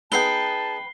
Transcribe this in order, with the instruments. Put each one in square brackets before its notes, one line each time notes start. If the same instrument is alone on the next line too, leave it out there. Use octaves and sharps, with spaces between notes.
[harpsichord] B3 D#4 G#4 [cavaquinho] B4 G5 [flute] A5 [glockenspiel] C7 G7